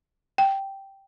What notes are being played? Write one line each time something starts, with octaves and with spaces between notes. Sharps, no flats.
G5